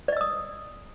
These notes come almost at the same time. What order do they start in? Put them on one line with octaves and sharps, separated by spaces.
D5 D#5 E6 D#6